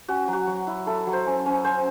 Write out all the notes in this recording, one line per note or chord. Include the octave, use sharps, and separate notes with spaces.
C#4 F#4
F#3
F#4
F#3
E4
E4 A4
F#3
C5
C#4
C#4
C#4 C5